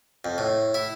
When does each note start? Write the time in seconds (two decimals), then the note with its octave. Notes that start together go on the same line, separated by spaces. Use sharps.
0.25 F2
0.38 A2
0.74 E4